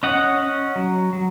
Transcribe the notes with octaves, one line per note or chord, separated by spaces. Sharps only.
C#4 D#5 F#5
C#4
F#3
F#3